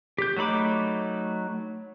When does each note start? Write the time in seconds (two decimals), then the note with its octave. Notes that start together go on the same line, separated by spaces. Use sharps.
0.18 G4 G6
0.37 F#3 A3 D#4 B5 D6